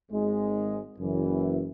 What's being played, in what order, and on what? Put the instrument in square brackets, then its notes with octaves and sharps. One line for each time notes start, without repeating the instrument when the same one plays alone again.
[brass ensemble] G#1 G#2 G#3
F#1 F#2 E3